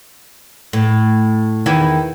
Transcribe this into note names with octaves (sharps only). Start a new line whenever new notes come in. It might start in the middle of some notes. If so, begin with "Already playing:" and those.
A2
E2 D#3 E4